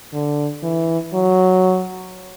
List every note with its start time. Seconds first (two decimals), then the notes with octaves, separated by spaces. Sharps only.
0.13 D3
0.63 E3
1.13 F#3